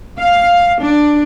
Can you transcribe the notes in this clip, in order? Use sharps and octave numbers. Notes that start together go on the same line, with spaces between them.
F5
D4